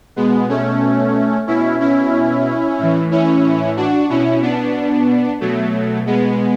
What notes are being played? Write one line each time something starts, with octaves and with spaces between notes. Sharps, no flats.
B2 G#3 B3
A3 C#4
B2 C#4 E4
C#4 E4
A2 E3
C#4 E4
D4 F#4
B2 C#4 E4
B3 D4
B2 F#3 A3
G#3 B3